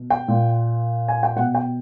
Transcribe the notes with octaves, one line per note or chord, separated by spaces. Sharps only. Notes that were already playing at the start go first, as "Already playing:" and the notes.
Already playing: B2
G5
A#2
G#5
G5
B2 F#5
G5